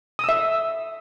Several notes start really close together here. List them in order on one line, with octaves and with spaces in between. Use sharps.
D#6 E6 E5